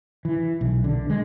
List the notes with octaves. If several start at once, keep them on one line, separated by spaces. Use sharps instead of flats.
E3
B1
D3
G#3